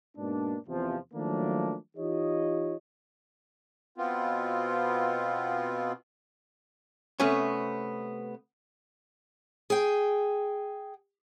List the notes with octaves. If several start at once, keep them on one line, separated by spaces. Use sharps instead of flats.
G#2 B2 A#3 D4
E2 C3 F3
D#3 F3 F#3 A3 A#3 D4
E3 D#4 F4 G4 C#5 D#5
B2 B3 C4 F4
C3 A3 B3 C#4
G#4 G5